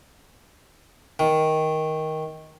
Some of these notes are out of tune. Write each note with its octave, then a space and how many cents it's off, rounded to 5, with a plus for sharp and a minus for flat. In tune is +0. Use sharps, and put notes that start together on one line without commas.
D#3 +10